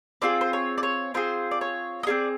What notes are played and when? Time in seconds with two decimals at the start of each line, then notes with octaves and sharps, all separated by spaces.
0.22 C4 F4 G#4 D5
0.41 C5
0.53 C#5
0.78 D5
0.83 C#5
1.14 C4 F4 G#4 C5
1.51 D5
1.61 C#5
2.03 D#5
2.07 C4 F4 G#4 D5